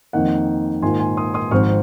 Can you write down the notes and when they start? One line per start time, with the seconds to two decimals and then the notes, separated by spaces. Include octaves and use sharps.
0.13 F2 D#3 A#3 D#4 F#5
0.82 G#2 D#3 A#3 F4 G#5 C6
1.00 G#5 C6
1.17 C6 D#6
1.34 C6 D#6
1.51 G#1 G#2 F3 C4 C#6 F6